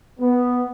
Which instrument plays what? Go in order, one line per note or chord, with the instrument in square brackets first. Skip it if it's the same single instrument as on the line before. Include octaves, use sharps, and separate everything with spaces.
[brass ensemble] B3